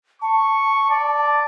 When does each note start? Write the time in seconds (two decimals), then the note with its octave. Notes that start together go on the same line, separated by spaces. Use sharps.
0.22 A5 C#6
0.90 D5